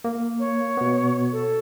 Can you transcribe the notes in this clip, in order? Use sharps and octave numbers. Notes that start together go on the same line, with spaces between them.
A#3
C#5
B2 B3
A4